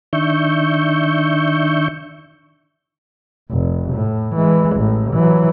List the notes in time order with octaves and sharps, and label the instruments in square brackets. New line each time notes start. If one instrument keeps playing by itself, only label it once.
[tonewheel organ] D#3 D4 E5 C#6 G6
[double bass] F1
A2
E3 G#3
A1 A2
E3 F#3